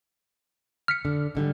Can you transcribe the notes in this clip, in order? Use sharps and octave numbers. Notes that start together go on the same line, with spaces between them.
F6 B6 C#7
D3
G#2 D3 G3